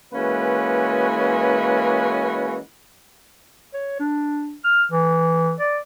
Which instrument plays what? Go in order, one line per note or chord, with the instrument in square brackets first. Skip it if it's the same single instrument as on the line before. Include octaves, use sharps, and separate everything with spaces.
[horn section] E3 G#3 A#3 C#4 F#4 B4
[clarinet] C#5
D4
F6
E3
D5